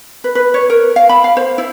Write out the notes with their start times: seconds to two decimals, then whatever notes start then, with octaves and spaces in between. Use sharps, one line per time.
0.24 B4
0.35 B4
0.54 C#5
0.70 A#4
0.96 F5
1.09 B5
1.24 F5
1.37 C5
1.58 E4